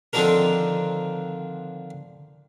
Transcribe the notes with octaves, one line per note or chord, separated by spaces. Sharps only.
D3 D#3 F3 C4 D4 A#4